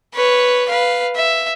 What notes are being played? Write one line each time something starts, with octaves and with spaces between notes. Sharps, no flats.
B4 C#5
B4 F5
E5